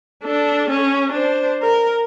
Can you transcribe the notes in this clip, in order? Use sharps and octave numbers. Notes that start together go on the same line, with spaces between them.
D4 A4
C#4
D4 C5
A#4